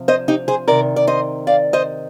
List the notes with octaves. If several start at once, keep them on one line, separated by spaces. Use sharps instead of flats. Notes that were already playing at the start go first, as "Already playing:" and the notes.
Already playing: C3 F3
C5 D#5
D#4 G4
G#4 C5
C3 D#3 A#4 D5
D5
C5 D#5
D5 F5
C5 D#5